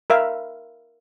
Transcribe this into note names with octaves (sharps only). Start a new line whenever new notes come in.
A#4 E5 F5